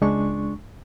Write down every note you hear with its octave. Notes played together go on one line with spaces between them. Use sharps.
C#2 G#3 D4 C#6